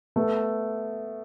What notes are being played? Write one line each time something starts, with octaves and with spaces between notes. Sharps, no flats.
A3 B3